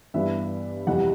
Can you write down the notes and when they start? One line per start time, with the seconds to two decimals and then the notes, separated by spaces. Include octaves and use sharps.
0.14 G2 E3 G3 B3 E5
0.87 F2 C3 E3 G3 F#5